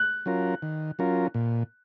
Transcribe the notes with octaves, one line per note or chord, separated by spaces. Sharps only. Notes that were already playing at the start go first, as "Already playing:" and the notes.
Already playing: F#6
F#3 C#4 F4 A#4
D#3
F#3 C#4 F4 A#4
A#2